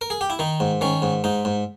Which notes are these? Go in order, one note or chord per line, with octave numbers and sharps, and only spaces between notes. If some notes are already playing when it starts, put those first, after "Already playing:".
A#4
G#4
G4
E4
D#3 D#4
G#2
D#3 C#4
G#2
G#2 D#4
G#2